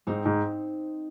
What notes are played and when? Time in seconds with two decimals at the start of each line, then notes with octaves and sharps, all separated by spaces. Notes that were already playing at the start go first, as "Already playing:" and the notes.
0.07 G#2 C4 D#4
0.25 G#2